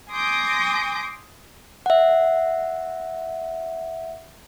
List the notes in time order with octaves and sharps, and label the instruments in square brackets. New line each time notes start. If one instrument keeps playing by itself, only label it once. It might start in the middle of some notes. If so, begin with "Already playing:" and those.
[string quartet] G#5 C6 D6 D#6 G6 A#6
[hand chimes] E5 F#5